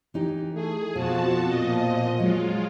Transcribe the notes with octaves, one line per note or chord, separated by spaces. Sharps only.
E3 D#4 G4
A3 G#4
F2 B2 F3 F#4 A5
A#2 D#5
F#3 G#3 F4